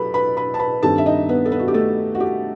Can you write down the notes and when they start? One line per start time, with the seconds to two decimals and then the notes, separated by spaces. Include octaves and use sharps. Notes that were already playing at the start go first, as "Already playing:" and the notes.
Already playing: F#3 G4 A4 B4 B5
0.14 B4 B5
0.37 B4 B5
0.54 A5
0.59 B4 B5
0.82 G2 D#3 G3 C4 A4 A5
0.98 E5
1.06 D#4 D#5
1.29 B3 B4
1.45 A4
1.52 B3 B4
1.59 F#4
1.68 G4
1.74 A3 A4
2.15 F#4
2.20 G4